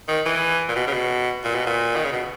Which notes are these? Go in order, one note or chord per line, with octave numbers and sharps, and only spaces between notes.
D#3
E3
A#2
B2
C#3
B2
A#2
B2
A#2
D#3
C#3
B2